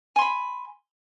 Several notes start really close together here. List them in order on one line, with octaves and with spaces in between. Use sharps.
G#5 C6 B5